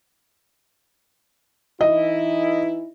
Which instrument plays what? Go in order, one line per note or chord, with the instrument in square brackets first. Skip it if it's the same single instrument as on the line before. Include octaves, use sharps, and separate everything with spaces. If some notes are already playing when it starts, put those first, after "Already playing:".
[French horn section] E3 D#4 E4 [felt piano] D#5